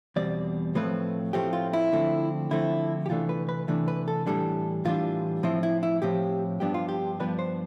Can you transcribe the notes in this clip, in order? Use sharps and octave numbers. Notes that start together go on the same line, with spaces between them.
E2 B2 G3 C4 D5
A2 F3 A3 C4 B4
A2 F3 A3 C4 G4
F4
E4
D3 F3 A3 C4
D3 F3 A3 C4 E4
G4
C3 E3 A3 D4 F4
B4
B4
C3 E3 A3 D4
B4
A4
A2 E3 G3 D4 A4
A2 E3 G3 D4 F4
A2 F3 C4 E4
E4
E4
A2 F3 C4 G4
G2 F3 B3 D4 G4
F4
G4
G2 F3 B3 D4 B4
C5